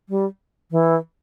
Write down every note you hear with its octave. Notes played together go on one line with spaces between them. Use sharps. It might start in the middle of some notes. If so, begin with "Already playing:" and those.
G3
E3